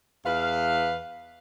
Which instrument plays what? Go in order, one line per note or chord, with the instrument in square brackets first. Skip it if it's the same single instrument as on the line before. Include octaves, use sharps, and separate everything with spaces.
[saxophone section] E2 B4 F5